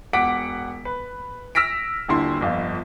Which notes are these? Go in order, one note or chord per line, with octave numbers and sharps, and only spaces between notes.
E1 F#5 D6 B6 D7
B4
E6 F6 A#6 B6 D7
D#1 D3 E4 C6
G1 F2 F4